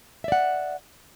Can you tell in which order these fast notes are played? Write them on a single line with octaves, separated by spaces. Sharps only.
E5 D5 F#5